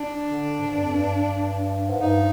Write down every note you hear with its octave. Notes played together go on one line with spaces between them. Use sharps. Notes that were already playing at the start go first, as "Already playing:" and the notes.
Already playing: D4
D3
G#2
G2
F2
G2
G#2
G2 D#4